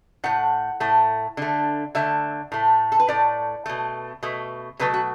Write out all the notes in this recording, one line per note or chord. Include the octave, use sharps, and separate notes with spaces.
A2 A3 F#5
A2 A3
D3 A3
D3 A3 E5
A2 A3
A4
B4
A2 A3 D5
B2 A3
B2 A3
B2 F#3 A3 B4
F#4